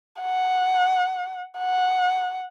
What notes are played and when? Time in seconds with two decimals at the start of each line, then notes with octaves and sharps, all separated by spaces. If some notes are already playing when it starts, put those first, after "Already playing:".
0.21 F#5
1.58 F#5